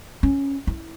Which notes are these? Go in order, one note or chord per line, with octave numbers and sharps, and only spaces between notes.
C#4
E4